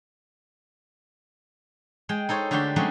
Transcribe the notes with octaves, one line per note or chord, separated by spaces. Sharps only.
G#3 G5
D#4 A4 C5 C#5
D3 A3 F#4 G4 D5 C6
F#3 G#3 A3 C4 C#4 D#4